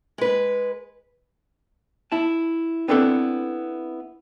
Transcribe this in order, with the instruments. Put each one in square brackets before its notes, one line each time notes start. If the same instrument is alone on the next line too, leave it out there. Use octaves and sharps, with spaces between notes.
[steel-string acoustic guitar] G#3 B4
[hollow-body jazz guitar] E4 A5
B3 C4 D4 E4 A4 B4